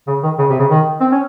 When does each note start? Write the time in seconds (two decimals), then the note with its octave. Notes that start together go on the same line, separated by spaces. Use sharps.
0.07 C#3
0.23 D#3
0.38 C#3
0.50 C3
0.59 C#3
0.70 D#3
1.00 C4
1.12 C#4